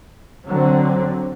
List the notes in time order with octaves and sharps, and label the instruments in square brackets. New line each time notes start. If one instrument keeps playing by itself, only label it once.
[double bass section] D3 F#3 C4